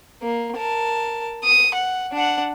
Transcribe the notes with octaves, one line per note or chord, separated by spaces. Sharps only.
A#3
A#4 A5
D#6
F#5
D4 F#5